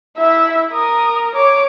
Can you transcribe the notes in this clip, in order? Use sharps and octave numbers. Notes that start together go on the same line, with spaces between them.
E4 E5
A#4 D#6
C#5 D6